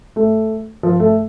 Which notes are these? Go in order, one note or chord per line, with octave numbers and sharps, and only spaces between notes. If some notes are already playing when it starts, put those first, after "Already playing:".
A3
F3
A3